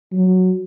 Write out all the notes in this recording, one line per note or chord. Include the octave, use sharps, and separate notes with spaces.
F#3